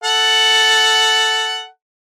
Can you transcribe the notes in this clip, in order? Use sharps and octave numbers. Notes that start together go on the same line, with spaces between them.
A4 F#5